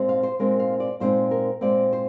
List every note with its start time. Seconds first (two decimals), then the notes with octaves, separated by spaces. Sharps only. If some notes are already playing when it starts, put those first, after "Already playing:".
Already playing: A#2 G#3 C4 D#4
0.09 F5
0.23 C5
0.39 A#2 G#3 C4 D#4 A#4
0.59 F5
0.80 D5
1.00 A#2 G#3 C4 D#4 C5
1.31 A#4
1.61 A#2 G#3 C4 D#4 D5
1.93 C5